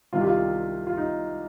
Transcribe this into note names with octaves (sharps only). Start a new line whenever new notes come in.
C2 C3 D#3 G3 F4
G4
F4
F4
D#4